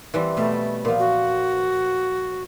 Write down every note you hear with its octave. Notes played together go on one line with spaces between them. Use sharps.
E3 G3 C4
B2 A3
A#2 F3
F#4